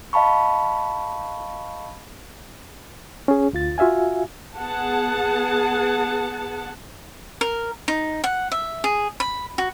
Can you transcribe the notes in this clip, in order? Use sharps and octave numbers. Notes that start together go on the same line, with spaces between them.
D#5 F5 A5 B5 C#6
C#4 G#4
D2 F4 A6
F4 F#4 E5 F5 G#5
B3 G#4 F#5 A5
A#4
D#4
F#5
E5
G#4
B5
F#4